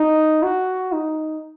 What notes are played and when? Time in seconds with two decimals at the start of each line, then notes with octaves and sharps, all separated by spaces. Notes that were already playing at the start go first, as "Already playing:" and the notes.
Already playing: D#4
0.43 F#4
0.93 D#4